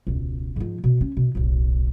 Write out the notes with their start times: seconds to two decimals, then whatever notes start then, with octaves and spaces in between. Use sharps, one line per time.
0.07 E1 C#2
0.56 G#2 F3
0.84 B2
1.01 C#4
1.17 B2
1.35 D1 B1